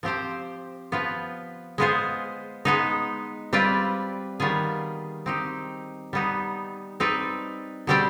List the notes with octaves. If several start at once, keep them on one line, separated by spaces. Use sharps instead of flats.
F3 C4 G4 C5
F3 B3 F4 B4
G#3 B3 F4 G#4 C5
G#3 B3 D#4
G3 C4 F4 B4 D5
D#3 G3 B3 F4 G#4
C4 D#4 G4
G3 B3 D#4
C4 D#4 B4 D5
B2 G3 C4 G4 D5